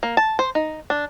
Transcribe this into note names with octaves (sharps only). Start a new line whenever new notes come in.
A#3
A5
C5
D#4
D4